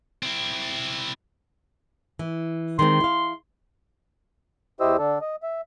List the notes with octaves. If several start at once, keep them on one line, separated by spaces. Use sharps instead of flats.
C4 E4
E3
D#3 G#3 C4 C6
E4 F5
E2 E4 G4 C5 D#5 E6
D3 D4 A4
D#5
E5